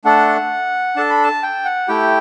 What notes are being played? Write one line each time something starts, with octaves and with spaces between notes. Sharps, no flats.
A3 D4 A4 F#5
D4 A4 A5
B5
A5
G5
F#5
A3 E4 G4 G5